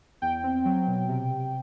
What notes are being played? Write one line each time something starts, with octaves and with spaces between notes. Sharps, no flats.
E2 G5
C4
F#3
B2
C3
C3